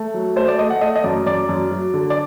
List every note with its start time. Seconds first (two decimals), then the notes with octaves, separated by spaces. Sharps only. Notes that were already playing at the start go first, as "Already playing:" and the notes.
Already playing: A3
0.14 F#3
0.36 A3 C5
0.48 D5
0.59 A3 D#5
0.70 F#5
0.81 A3 D#5
0.96 D#5
1.04 F#2 D5
1.26 F#2 D5
1.49 F#2
1.71 F#3
1.94 D3
2.10 D5